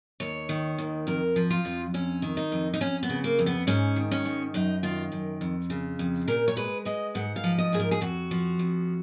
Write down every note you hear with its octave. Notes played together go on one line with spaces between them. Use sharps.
D#2 C#5
D#3
D#2
F2 A#4
F3
F4
F2
F2 C#4
D#3
D#4
F2
D#4
F2 C#4
B3
C#3
A#3
F2
B3
G#2 C#4
D#3
C#4
G#2
F#2 D#4
D#3 F4
F#2
F2
C#3
F2
A#2 A#4
C#5
G#3 B4
G#3 D#5
G#2 F#5
F5
F3
D#5
G#2 G#4
A#4
G#4
F2 F#4
F3
F2